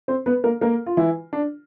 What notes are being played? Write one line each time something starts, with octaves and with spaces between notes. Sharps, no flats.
C4 C5
B3 B4
A#3 A#4
A#3 A#4
F4
E3 E4
D4